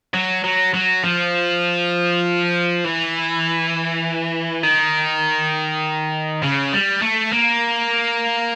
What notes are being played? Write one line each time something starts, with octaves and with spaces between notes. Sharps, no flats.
F#3
F#3
F#3
F3
E3
D#3
C#3
G3
A3
A#3